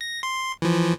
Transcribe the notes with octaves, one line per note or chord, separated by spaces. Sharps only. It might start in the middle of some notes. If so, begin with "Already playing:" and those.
A#6
C6
E3 F3